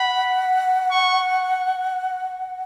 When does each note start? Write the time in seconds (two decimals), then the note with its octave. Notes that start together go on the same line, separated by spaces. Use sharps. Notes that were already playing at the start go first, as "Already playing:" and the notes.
Already playing: F#5 B5
0.91 C#6